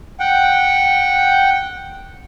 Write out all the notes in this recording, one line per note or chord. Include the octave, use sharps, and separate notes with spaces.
F#5 G5